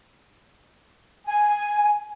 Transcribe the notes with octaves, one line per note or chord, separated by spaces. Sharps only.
G#5